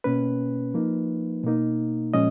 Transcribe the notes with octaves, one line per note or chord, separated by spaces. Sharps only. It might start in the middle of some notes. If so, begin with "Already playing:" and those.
B2 A#3 C#4 B4
F3 A#3 D#4
B2 A#3 D#4
A#2 F3 G#3 C#4 D#5